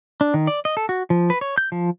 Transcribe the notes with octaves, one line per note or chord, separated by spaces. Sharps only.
D4
D#3
D5
D#5
A4
F#4
F3
B4
C#5
G6
F3